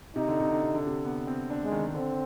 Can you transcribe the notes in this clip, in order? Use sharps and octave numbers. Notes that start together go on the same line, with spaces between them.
C3 D#4
D3
C3
D3
C3
D3
C3
B3
C4
D4
G#3
D#3
D3 C4